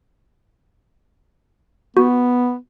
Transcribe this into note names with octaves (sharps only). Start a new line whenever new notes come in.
B3 F#4